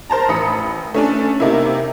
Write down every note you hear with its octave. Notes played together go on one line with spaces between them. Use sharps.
A#4 C5 A5 A#5
A1 B5 D#6 C#7
A3 C#4 D4
C3 A#3 D#4 E4